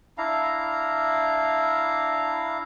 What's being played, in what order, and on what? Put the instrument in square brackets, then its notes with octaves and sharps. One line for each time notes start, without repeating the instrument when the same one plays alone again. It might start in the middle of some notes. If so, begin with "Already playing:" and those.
[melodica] D4 E4 F5 A#5